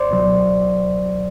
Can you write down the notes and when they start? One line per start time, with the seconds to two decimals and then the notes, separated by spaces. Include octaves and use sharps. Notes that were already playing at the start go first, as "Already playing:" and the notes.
Already playing: C5 D5
0.09 C#2 B2 F#3